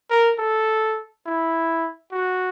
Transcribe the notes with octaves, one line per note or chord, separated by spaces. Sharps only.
A#4
A4
E4
F#4